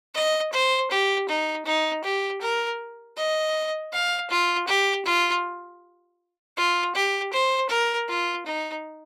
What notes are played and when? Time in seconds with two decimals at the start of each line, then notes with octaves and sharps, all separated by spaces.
0.15 D#5
0.53 C5
0.91 G4
1.29 D#4
1.65 D#4
2.04 G4
2.42 A#4
3.17 D#5
3.93 F5
4.30 F4
4.68 G4
5.05 F4
6.57 F4
6.95 G4
7.33 C5
7.70 A#4
8.08 F4
8.46 D#4